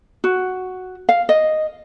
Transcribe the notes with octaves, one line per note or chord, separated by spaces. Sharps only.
F#4
F5
D#5